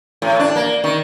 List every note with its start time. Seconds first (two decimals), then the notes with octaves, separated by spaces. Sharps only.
0.22 A2
0.39 D4
0.56 A#3
0.84 D#3